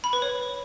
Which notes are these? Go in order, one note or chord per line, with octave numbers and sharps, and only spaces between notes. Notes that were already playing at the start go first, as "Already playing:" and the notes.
B5
B4
C#5